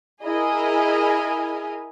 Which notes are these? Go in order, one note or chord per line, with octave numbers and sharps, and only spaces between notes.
E4 G#4 A#4 D#5 G#5